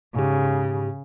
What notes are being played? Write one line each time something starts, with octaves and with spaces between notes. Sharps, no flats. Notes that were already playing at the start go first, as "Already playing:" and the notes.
G#2 C#3 G4